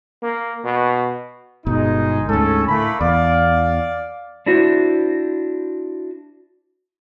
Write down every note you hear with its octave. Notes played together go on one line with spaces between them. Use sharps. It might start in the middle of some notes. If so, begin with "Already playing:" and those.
A#3
B2
G1 B2 G#3 D#4
D2 G#2 C#4 A4
A2 A3 A#3 B5
E2 D5 F5
D4 E4 F#4 C5